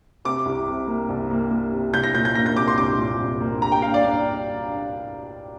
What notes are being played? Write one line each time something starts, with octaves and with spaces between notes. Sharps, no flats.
C3 D6
C2
C3
A#3
C2
A#3
A#3
C3
C2 G6
A#6
A#2 G6
G6
A#3 A#6
G6
C2 D6
C6
C2 D6
A#2
C2
A#3
G2 A#5
G5
G2 F5
D5
D4